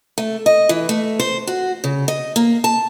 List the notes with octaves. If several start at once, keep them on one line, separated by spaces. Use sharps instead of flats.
A3
D#5
E3
A3
C5
F#4
C#3
D#5
A#3
A5